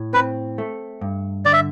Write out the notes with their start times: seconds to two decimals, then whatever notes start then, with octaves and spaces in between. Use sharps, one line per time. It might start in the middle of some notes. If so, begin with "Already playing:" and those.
Already playing: A2
0.13 C4 B4
0.58 A3
1.01 G2
1.45 D3 D5
1.53 E5